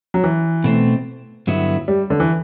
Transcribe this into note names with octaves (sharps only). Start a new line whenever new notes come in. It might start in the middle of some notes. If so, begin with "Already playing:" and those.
F#3
E3
B2 A3 C4
G2 D3 F#3 B3 E4
G3
D3
E3